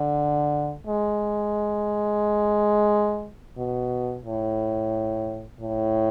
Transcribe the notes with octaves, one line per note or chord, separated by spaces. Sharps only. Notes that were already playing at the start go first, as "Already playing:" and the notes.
Already playing: D3
G#3
B2
A2
A2